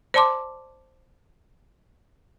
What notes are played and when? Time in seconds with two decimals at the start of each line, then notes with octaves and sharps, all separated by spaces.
0.14 C5 D5 A5 C6 D6